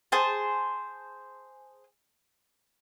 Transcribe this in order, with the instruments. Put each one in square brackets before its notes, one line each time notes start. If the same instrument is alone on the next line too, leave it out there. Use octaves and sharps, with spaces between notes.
[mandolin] G#4 C5 A5